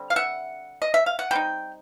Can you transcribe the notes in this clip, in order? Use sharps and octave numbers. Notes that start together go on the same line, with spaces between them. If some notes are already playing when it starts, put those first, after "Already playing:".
Already playing: D3 G3 C4
F5
E5 F#5
D#5
E5
F5
F#5
G3 C4 D#4 G5